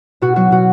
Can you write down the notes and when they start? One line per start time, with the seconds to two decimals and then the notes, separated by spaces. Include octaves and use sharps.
0.22 B2 F#4
0.36 F#3 F#4
0.51 B2 F#4